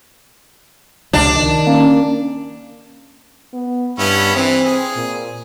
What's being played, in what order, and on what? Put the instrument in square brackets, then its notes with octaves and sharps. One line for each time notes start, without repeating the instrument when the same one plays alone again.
[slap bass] C#2 C3 F3 [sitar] D4
[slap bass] D#3
[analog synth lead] A#3 [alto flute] C#4
[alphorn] B3
[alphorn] G2 [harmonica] B3 C#4 E4
[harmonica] E3 [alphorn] C4
[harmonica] G#4
[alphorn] A#2